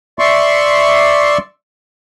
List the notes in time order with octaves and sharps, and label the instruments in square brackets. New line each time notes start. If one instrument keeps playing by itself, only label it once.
[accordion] D5 E5 C6 C#6